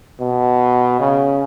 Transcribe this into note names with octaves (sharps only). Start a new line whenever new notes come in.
B2
C#3